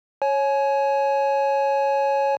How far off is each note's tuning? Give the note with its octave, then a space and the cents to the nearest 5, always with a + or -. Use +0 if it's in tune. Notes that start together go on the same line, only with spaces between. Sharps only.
C#5 -10 G#5 +30